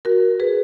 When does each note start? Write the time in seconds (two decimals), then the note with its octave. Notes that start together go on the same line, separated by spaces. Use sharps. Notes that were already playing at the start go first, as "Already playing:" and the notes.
0.05 F#4 A#4
0.40 G#4 B4